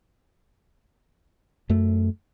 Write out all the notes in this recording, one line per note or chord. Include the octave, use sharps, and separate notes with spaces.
F#2 A3